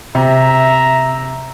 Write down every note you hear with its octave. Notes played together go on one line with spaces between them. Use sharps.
C3 E5 A#5